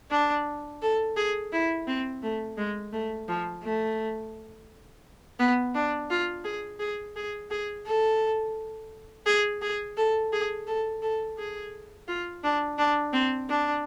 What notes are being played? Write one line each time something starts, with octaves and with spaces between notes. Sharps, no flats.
D4
A4
G#4
E4
C4
A3
G#3
A3
F3
A3
B3
D4
F4
G#4
G#4
G#4
G#4
A4
G#4
G#4
A4
G#4
A4
A4
G#4
F4
D4
D4
C4
D4